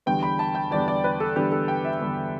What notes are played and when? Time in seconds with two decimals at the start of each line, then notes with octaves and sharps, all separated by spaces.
0.06 E2 D3 G3 B3 D4 G5
0.23 B5
0.39 A5
0.55 G5
0.71 E2 D3 G3 B3 D4 D5
0.88 D5
1.04 B4
1.20 A4
1.36 E2 D3 G3 B3 D4 G4
1.52 A4
1.68 G5
1.85 E5
2.01 E2 D3 G3 B3 D4